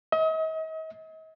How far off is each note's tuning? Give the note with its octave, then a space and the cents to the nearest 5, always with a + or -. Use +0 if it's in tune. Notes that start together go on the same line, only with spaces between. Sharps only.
D#5 +40